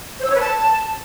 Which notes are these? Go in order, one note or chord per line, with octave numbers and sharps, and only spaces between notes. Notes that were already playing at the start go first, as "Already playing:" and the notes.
C5
E6
C#5
B4
A5